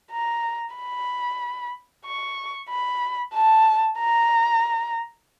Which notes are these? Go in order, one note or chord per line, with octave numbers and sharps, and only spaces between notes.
A#5
B5
C#6
B5
A5
A#5